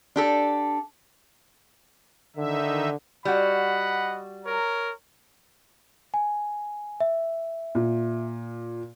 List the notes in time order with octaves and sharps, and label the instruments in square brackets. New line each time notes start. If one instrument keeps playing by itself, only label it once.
[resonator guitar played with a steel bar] D4 G4 A4
[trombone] D3 [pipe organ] D#3 D#4 E5
[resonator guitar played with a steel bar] G3 F#4 [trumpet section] D#5 F#5 B5
[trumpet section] A#4 C#5 A#5
[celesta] G#5
E5
[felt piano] A#2